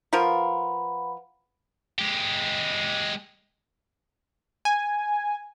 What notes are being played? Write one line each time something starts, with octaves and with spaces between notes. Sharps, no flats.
F3 F4 A#4 B4 F#5 B5
G#3 G4
G#5